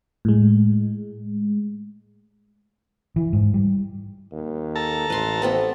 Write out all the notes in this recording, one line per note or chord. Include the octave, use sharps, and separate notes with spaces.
A2 G#3
E3
G#2
G3
D#2
A4 A5 A#5
A1 B4 C6
A3 B3 C4